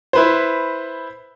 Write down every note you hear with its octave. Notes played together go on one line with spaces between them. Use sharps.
E4 B4 C5